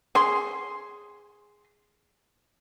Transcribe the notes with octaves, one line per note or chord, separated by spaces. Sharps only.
G#4 C6